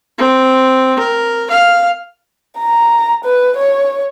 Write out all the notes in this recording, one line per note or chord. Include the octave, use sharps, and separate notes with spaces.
C4
A#4
F5
A#5
B4
C#5